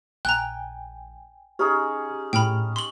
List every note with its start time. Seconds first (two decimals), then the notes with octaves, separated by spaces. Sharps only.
0.25 A#1 G5 G#5 A#5 F#6
1.59 C#4 D#4 G4 G#4
2.33 A2 G5 B5 F6
2.76 C6 F#7